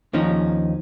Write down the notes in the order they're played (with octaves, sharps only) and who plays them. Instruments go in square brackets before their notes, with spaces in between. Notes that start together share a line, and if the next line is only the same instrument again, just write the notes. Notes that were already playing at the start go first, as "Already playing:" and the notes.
[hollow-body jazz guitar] D#2 F3 C#4 D#4